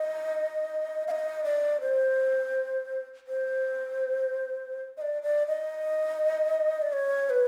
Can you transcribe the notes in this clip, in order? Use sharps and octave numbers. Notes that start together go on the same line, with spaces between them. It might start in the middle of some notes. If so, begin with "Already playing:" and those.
Already playing: D#5
F5
D#5
D5
C5
C5
D#5
D5
D5
D#5
D5
C#5
B4